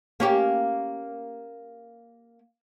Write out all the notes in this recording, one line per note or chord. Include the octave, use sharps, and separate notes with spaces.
A#3 C#4 G4